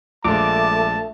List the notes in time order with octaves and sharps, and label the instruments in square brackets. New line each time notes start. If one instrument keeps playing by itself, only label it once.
[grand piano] A#1 G#3 [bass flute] A3 [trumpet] A5 [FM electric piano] D6